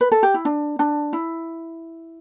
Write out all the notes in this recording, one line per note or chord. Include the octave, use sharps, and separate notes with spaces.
B4
A4
G4
E4
D4
D4
E4